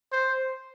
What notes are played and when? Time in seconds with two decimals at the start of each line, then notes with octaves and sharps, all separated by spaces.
0.12 C5